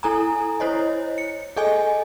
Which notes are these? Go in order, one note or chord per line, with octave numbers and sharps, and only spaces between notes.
E4 A4 G#5 A#5
E4 C5 C#5 D#5
C#7
G#4 A4 D#5 G#5